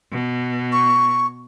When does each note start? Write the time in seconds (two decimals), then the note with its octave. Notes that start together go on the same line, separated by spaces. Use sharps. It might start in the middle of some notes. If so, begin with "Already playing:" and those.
0.12 B2
0.72 C#6